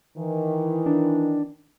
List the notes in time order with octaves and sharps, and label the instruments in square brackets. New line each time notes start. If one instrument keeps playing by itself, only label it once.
[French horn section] D#3 E3
[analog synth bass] D4